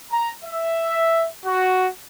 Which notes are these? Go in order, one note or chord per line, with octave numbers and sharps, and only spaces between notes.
A#5
E5
F#4